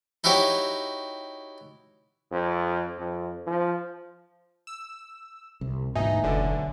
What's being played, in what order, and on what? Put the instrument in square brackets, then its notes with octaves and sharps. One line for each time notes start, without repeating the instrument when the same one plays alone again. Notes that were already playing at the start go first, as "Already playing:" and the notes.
[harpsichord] D#4 E4 F#4 G4 C#5
[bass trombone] F2
F2
F3
[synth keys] E6
[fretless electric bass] C2 [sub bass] C3
[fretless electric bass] A1 D2 B2 [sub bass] G#2 [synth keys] D#4 [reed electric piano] E5 G#5
[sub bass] F#1 [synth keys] B1 D3